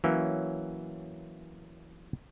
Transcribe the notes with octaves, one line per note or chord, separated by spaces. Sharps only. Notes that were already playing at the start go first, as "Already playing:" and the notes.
E3 F#3 A#3 C#4